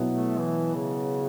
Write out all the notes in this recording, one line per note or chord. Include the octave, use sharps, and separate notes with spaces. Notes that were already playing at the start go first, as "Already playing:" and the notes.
Already playing: B2 F#3 B3 E4
A3
E3
C#3